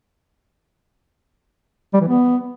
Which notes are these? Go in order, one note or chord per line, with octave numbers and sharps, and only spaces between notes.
G3
E3
B3